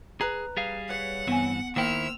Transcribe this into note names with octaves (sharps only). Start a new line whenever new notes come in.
G#4 B4 A#5
G3 G#4 F5
B4 C#5 F#5
G2 E3 B3 C4 G#5
D#3 A#3 E4 A#4 C5 G5 E6 F7